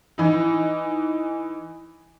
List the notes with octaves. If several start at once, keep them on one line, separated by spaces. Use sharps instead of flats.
E3 D#4